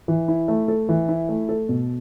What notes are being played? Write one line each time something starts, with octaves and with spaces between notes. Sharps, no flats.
E3
E4
A3
A4
E3
E4
A3
A4
B2